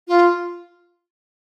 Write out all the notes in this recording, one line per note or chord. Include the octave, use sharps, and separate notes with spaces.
F4